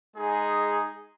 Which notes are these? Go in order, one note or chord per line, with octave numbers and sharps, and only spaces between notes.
G#3 D#4 G#4